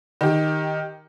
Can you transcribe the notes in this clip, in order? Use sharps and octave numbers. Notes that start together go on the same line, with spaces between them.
D#3 G4